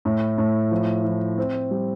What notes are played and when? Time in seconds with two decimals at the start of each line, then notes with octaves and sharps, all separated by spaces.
0.05 A2
0.38 A2
0.71 F3
1.04 F3
1.38 C4
1.71 G3